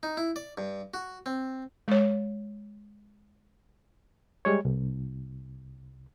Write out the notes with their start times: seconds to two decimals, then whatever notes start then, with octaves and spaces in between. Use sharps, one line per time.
0.03 D#4
0.17 E4
0.36 D5
0.58 G2
0.94 F#4
1.26 C4
1.88 G#3 C#5
4.45 G3 G#3 C#5
4.65 C2